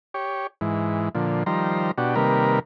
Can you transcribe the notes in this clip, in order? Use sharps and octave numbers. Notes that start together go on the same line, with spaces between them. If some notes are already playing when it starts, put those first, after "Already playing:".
G4 C#5
G#2 E3
A#2 D3 F3
D#3 F3 G3 C5 A#5
B2 D4 F#4 G4
C3 D#3 G3 A#3 A#4 B4